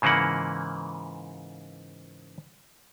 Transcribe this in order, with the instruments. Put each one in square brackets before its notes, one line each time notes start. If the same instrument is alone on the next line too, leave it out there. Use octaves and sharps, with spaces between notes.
[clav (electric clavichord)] G#2 C#3 E3 A#3 F#5